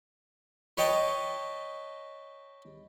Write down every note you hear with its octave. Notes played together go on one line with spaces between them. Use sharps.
B4 C#5 D#5 G5 A5